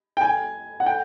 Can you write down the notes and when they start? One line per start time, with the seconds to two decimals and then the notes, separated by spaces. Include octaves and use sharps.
0.17 G5
0.21 G#5
0.80 F#5
0.86 G5